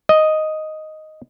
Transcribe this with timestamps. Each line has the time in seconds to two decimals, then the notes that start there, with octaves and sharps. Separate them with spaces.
0.09 D#5